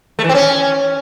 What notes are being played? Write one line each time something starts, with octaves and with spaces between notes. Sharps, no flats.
A3
E3
C4
C#4